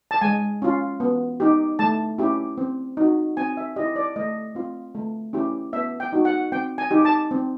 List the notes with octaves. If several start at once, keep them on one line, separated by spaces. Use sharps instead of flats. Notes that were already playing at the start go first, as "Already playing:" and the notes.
A5
G#3 G#5
C#4 F4
B3
D#4 G4
A3 A5
C#4 E4 G4
C4
D#4 F#4
C4 G#5
E5
E4 G4 D#5
D5
A3 D#5
C4 F4
A3
C#4 E4 G4
B3 E5
G5
D#4 F#4
F#5
C4 G5
G#5
D#4 G4
A5
C4